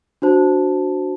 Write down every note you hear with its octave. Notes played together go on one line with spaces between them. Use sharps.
D4 F#4 C5 A5